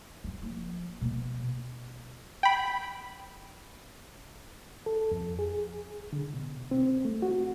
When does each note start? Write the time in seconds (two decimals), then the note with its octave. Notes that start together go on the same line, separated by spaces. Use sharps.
0.24 F#3
0.42 F3 A#3
1.01 B2 A#3
2.43 G5 B5
4.86 A4
5.12 F2
5.39 G#4
6.13 D3
6.34 B2
6.71 C4
7.05 A3
7.22 F#4